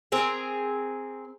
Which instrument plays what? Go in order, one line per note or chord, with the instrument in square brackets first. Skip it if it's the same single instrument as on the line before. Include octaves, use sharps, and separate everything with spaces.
[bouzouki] C4 G#4 A#4